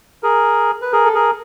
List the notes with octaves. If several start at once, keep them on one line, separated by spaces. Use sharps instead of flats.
G#4 A#4
B4
G#4 A#4
A4
G#4 A#4